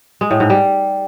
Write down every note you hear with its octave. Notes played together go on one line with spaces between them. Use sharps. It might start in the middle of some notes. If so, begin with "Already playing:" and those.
G#3
A2
G#2
G3